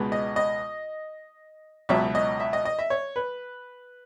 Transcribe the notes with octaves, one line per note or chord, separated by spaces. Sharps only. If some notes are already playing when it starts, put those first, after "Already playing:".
Already playing: C#2 B2 G#3 B3
D#5
D#5
C#2 B2 F#3 E5
D#5
E5
D#5
D#5
E5
C#5
B4